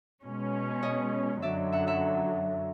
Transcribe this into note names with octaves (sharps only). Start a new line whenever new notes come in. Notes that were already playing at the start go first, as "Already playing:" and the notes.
B2 G#3 C#4
C#5 D#5
F#2 D3 F#3 D5 E5
E5 F#5
E5 F#5